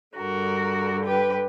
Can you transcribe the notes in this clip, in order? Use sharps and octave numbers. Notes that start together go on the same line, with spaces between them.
G2 D3 F#4 A#4
G4 B4